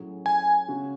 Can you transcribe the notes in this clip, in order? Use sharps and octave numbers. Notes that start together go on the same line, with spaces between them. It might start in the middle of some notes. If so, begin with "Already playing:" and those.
Already playing: A2 F#3 C#4 G#4
G#5
C#3 G#3 C#4 F#4